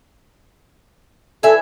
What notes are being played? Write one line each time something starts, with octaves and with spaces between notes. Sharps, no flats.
E3 A4 E5 G#5